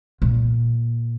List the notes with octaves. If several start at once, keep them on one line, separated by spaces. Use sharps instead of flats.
A#2